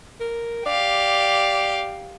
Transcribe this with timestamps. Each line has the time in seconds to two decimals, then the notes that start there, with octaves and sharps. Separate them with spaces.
0.20 A#4
0.66 G4 D5 F5